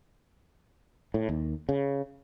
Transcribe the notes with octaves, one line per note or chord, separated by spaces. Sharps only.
A2
D#2
C#3